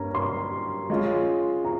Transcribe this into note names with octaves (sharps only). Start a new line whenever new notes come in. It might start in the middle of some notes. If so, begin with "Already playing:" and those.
Already playing: G2 G3 A#3 C#4 A#5
C6
G#3 C#4 F4
A#5